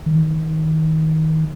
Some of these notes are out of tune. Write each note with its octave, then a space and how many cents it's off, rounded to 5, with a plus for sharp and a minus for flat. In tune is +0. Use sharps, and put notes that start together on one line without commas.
D#3 +25